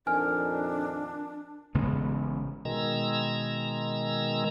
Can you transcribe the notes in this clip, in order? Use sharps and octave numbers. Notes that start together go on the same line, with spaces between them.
F2 A#2 D#3 D4 G#5 F6
A1 C#3 G#3 B3
B2 D#3 G#3 A#5 E6